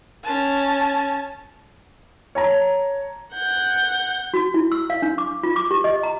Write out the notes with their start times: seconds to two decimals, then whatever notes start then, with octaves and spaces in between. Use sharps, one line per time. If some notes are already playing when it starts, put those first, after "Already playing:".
0.23 C#4 A5
2.35 C#5 A5 A#5
3.35 F#5 G6
4.34 F#4
4.54 E4
4.72 E6
4.90 F5
5.02 D4
5.18 D6
5.43 F4
5.56 D6
5.71 G4
5.84 D#5
6.03 A#5